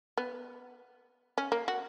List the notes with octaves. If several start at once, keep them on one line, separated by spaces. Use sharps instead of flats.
B3
C#4
A#3
F#4